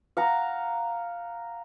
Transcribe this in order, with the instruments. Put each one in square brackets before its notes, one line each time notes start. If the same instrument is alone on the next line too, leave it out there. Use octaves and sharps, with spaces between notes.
[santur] F5 F#5 A#5